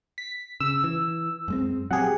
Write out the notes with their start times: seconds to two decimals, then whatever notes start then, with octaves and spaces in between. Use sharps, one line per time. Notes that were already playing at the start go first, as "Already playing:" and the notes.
0.18 B6
0.60 C#3 E6
0.84 E3
1.48 F#2 G#3 C4
1.91 A#1 F#3 C4 G4 G#4 F#5